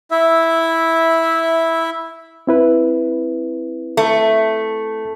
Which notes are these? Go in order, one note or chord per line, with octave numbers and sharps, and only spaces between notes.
E4 E5
C4 E4 B4
A3